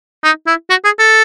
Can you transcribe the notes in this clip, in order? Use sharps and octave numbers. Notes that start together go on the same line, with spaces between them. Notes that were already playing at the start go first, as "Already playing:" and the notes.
D#4
E4
F#4
G#4
A4